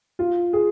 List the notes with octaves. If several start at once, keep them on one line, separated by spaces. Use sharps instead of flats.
F4
G#4